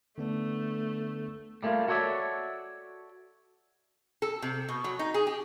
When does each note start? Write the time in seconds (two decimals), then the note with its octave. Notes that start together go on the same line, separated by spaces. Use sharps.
0.18 D3 A3 B3 D4
1.63 G3 A3 A#3 D4 F4
1.88 F#4 A4 C#5 D5 E5
4.22 A4
4.42 C3
4.69 B2
4.84 F#3
4.99 D#4
5.14 G#4
5.27 G4